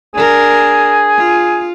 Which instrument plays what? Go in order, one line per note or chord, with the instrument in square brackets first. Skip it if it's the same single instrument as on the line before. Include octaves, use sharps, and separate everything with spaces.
[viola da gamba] D4 A#4 [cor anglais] G#4
[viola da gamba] F4